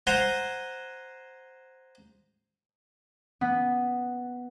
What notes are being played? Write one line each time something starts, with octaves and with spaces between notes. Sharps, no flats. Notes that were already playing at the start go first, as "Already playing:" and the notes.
C5 F#5 G#5 A#5 C6
B3